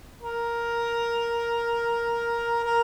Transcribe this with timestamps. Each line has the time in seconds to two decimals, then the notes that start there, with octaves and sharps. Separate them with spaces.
0.22 A#4
2.64 A#4